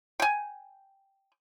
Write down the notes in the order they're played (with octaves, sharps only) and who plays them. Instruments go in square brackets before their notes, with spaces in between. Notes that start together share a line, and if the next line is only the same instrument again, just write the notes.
[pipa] G5 G#5